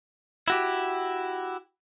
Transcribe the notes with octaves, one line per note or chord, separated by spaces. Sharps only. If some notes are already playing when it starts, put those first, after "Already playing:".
E4 F#4 G4